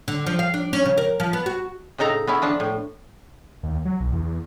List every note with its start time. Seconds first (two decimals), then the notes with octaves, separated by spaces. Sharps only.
0.08 D3
0.26 F3
0.39 F5
0.54 D4
0.73 C#4
0.85 C#3
0.97 A#4
1.20 F3
1.33 B3
1.46 F#4
1.98 A2 C#3 D#4 A4 A#5
2.27 B3 C#4 E4
2.42 F3 D4 A5
2.60 A2
3.63 D#2
3.85 F#3
4.00 B1
4.12 E2